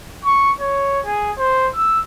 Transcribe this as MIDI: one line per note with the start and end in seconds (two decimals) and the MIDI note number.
0.25 0.51 85
0.60 0.99 73
1.06 1.32 68
1.38 1.68 72
1.75 2.00 88